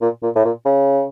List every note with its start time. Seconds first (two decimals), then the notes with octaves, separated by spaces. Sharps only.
0.02 A#2
0.23 A#2
0.35 A2
0.45 A#2
0.65 C#3